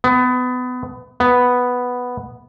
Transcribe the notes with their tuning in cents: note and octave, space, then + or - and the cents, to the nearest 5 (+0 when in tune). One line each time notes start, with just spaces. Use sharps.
B3 +25
B3 +0